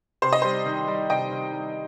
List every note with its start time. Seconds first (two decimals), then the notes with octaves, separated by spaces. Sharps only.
0.22 C3 C5
0.33 D#5
0.42 G3 C5
0.66 D#3
0.88 G3
1.10 C3 D#5 G5
1.32 D#3
1.54 G3